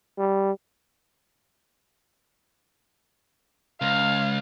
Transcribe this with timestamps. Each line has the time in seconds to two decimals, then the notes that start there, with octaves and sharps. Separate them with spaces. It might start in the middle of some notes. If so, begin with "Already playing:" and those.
0.19 G3
3.82 C#2 F5